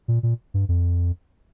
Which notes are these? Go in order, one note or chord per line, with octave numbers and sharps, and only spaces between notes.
A#2
A#2
G2
F2